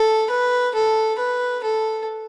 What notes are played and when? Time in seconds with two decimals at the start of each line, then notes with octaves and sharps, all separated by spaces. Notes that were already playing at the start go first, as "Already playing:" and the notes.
Already playing: A4
0.30 B4
0.75 A4
1.19 B4
1.64 A4